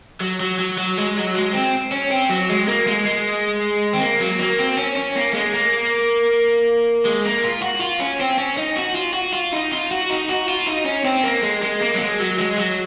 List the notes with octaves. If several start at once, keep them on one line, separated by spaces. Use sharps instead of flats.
F#3
F#3
F#3
F#3
G#3
F#3
G#3
C4
C#4
C4
F#3
G#3
A#3
G#3
G#3
C4
A#3
F#3
A#3
C4
C#4
C#4
A#3
G#3
A#3
G#3
A#3
F4
F#4
F4
C#4
C4
C#4
D#4
F#4
F4
F#4
F4
D#4
F4
F#4
D#4
F#4
F4
D#4
C#4
C4
A#3
G#3
G#3
A#3
F#3
G#3
F#3
G#3
F#3